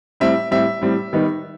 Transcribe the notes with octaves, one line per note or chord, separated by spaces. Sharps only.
A2 G3 C4 E5
A2 G3 C4 E5
A2 G3 C4
D#3 G3 B3 D#4